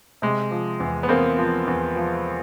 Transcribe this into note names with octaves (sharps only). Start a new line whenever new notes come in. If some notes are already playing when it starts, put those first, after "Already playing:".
C3 G#3
F3
E2
B3
E2 A#3 C4
F3
E2
F3